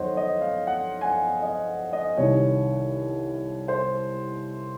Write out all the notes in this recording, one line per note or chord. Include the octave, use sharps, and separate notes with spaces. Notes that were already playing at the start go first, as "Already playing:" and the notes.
Already playing: F2 D#3 F#3 C5 C#5 D#5 F#5
D#5
F5
F#5
G#5
F#5
D#5
D#5
C2 C3 D#3 C#5
C5